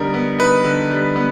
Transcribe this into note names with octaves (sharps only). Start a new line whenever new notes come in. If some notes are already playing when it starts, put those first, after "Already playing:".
Already playing: D3 G3 B3 D#4 A#4
B3
D#4 B4
D3
G3
B3